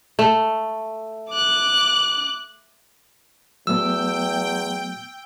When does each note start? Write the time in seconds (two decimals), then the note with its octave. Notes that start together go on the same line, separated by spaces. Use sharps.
0.19 A3
1.32 D6 F#6
3.67 E2 F#3 A3 B3 G5 E6